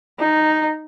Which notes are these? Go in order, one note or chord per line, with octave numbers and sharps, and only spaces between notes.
D#4